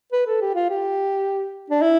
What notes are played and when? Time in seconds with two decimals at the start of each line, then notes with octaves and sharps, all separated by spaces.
0.13 B4
0.27 A4
0.41 G4
0.55 F4
0.70 G4
1.70 D4
1.82 E4